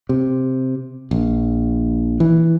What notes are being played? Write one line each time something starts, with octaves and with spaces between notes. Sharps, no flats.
C3
A#1
E3